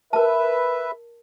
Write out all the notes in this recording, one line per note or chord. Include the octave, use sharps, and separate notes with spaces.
A#4 B4 E5 A5